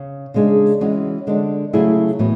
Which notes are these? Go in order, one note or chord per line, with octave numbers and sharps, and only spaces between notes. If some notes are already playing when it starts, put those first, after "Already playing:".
Already playing: C#3
C#3 G#3 D4 G#4
E3 G#3 C#4 F#4
D3 G#3 D4
C#3 F#3 A3 E4 G#4
A2 E3 B3 F#4